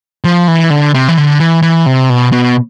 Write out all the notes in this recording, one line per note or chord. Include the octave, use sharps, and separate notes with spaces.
F3
E3
D3
C3
E3
D3
E3
E3
C3
B2
B2